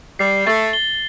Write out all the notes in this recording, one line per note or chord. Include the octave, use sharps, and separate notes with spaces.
G3 C7
A3 A6
G7